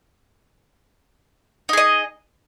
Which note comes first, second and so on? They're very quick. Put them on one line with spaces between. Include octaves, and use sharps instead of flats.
D#4 G#4 D#5